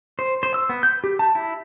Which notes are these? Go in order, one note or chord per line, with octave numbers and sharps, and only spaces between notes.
C5
C5
E6
B3
G6
G4
A5
E4